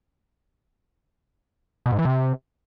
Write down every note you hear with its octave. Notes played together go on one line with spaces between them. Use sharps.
B2
G#2
E3
C3